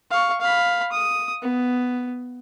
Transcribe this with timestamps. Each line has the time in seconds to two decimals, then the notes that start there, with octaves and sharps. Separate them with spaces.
0.11 F5 C#6
0.41 F5 B5
0.92 D#6
1.42 B3